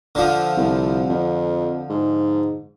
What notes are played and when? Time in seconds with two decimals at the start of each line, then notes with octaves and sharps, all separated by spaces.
0.15 D3 F3
0.57 C2
1.10 F2
1.90 G#2